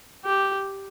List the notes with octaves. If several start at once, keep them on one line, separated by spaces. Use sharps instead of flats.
G4